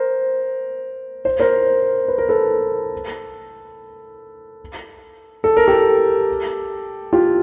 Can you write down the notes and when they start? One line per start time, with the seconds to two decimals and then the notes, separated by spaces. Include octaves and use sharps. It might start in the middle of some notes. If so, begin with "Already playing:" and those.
Already playing: A#4 C5
1.25 C5
1.40 A#4 C5
2.08 B4
2.18 A#4
2.29 A4 B4
5.44 A4
5.57 A#4
5.68 G4 A4
7.13 F4 G4